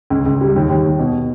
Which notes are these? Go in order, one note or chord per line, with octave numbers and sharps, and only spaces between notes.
C#2
C#2
G3
D#2
D#2
D#2
B2